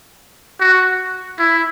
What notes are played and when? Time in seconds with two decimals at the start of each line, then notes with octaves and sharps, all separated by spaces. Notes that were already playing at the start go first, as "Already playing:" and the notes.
0.60 F#4
1.39 E4